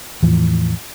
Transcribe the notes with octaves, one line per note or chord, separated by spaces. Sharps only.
E2 A2 E3 F3